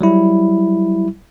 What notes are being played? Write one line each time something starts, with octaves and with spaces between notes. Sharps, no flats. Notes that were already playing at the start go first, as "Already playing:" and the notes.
F#3 G3 E4